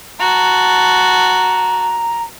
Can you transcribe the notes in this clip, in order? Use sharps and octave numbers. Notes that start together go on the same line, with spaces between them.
F#4 A5 A#5